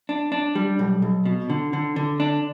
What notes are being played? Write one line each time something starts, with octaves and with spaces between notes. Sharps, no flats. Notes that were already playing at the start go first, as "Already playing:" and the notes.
D4
D4
G3
B1
B1
B2
D3
D3
D3
D4